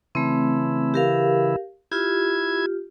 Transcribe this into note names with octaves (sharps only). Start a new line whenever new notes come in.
C#3 E3 A3 C4 E4
G4 A#4 F5
E4 F4 G4 G#6